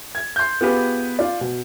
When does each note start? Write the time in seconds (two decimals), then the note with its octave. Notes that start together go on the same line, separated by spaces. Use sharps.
0.15 G#6
0.36 C6 G6
0.61 B3 F4 G4 G#4 B4
1.19 F4 D5
1.41 B2